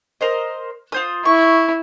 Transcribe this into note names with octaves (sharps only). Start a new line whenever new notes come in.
A#4 C5 D#5
F4 C5 D#6
E4 C#6